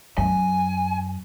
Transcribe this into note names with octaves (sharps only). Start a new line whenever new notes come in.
F#2 G#5